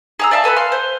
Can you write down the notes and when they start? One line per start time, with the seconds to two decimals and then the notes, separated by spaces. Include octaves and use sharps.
0.19 G#4 A#5 E6
0.31 D5 E5 F5 A5
0.44 A4 B4 G#5 B5
0.56 F5 C6
0.72 C5